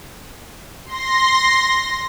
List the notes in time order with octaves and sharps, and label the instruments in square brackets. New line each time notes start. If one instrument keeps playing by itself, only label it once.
[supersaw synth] C6 A#6